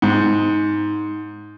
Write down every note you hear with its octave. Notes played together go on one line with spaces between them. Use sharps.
G#2